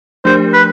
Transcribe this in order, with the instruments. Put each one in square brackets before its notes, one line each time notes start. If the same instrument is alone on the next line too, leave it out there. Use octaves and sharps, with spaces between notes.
[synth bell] F3 A3 D4 G4 A#4 [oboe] C5
[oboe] B4